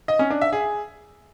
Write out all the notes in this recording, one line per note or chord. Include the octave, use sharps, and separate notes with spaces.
D#5
C#4
D4
E5
G#4